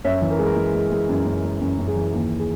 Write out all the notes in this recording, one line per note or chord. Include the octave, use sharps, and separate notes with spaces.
F#2 C#5 E5
E3
A#4
G#3 G#4
A#4
G#3
G#3
G#3
F#2
F#2
G#3
F#2
F#2
G#4
E3
D#2 G#4
G#4